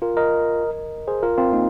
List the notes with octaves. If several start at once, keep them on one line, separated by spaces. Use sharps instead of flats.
F4 A#4
A#4 D#5
G#4 C5
F4 A#4
C4 F4
A#3 D#4